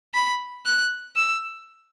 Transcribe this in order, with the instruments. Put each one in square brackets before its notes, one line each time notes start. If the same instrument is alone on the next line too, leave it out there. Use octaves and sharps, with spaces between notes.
[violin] B5
F#6
E6